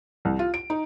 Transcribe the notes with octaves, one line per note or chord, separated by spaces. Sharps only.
C2
F4
D7
D#4